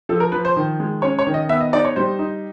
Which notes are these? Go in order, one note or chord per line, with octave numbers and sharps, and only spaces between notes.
F3 A4
A#4
F3 B4
C5
D#3
G#3
C#4 C#5
C#5
D#3
D#5
B3 E5
D#5
D#4 D5
C#5
G3 C5
D#4